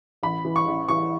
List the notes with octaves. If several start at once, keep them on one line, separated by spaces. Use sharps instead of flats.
A1 B5
E3
C#6
A1
E3 C#6